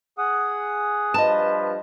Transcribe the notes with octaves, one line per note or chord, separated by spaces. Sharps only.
G#4 F#5 D#6
G2 F3 B4 D#5 A5